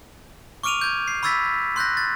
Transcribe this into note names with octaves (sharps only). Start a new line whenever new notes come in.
C#6 D6 F6 D7 D#7 F7
G6 G#6
C7
B5 C#6 E6 G#6 A6 B6
C6 F#6 G6 A#6
A6